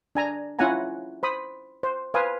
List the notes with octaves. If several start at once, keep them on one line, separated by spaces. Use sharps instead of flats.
D4 G#5 A#5
C#4 E4 F4 F#5 G#5 A#5
C5 B5 D#6
C5
B4 C5 F5 G#5 D#6